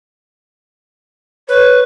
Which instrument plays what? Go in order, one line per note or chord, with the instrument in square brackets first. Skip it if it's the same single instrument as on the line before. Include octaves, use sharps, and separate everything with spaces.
[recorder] B4 [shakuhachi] C#5